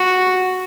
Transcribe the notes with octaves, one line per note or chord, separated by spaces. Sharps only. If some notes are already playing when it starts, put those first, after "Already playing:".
Already playing: F#4